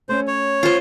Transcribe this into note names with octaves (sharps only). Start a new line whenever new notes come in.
A3 C#4 C5
C#5
F4 C5